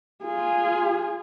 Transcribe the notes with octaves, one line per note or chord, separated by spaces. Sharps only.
F4 G#4